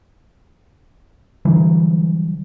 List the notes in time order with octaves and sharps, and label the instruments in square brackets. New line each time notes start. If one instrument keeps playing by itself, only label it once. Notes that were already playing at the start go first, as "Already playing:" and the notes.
[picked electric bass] D3 E3 F#3 G3